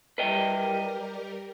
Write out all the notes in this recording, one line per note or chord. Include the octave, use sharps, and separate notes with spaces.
G3 G4 A#4 B4 D#5 G5